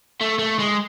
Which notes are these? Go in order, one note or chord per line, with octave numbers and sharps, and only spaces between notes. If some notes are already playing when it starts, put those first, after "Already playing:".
A3
A3
G#3